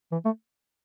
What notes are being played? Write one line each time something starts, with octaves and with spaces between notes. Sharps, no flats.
E3
A3